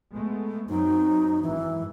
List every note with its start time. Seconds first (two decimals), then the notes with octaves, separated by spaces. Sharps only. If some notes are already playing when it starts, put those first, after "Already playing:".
0.13 G#3 A3 B3
0.69 F#2 F#3 C4 D#4
1.42 G#1 F#2 E3